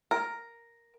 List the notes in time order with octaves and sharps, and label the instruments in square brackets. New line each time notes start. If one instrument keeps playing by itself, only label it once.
[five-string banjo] A#4